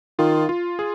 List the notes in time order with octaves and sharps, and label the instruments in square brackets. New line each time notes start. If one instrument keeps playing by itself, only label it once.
[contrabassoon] D#3 [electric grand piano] F4
[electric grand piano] F4
G#4